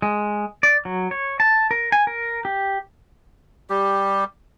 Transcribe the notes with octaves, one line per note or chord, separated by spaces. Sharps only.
G#3
D5
F#3
C#5
A5
A#4
G#5
A#4
G4
G3 G4